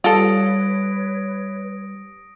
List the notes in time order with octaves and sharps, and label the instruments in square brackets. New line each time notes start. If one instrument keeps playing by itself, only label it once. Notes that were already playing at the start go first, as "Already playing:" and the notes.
[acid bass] G3 [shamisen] F4 A4 [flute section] B4 C#5 [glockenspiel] D#6 A#6 D7